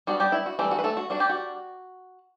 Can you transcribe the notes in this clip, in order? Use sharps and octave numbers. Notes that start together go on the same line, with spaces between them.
G3 B3 D4 F#4
G3 G4
E4
F#4
E3 G3 A3 C4 G4
F#4
B4
A3 A4
F#4
G3 D4 F#4
G4
F#4